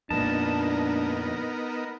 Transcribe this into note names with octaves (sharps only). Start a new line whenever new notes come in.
F2 A#2 B3 D4 D#4 A#4 A5